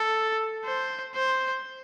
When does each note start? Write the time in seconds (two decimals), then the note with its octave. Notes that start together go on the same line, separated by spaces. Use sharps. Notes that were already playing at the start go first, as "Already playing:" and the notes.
Already playing: A4
0.65 C5
1.15 C5